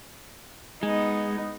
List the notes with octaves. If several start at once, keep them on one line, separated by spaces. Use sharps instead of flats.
G#3 B3 D#4